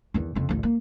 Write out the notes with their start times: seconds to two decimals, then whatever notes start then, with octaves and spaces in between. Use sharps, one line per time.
0.14 E2 D#3
0.35 F2 C#3
0.49 A1 D2
0.63 A#3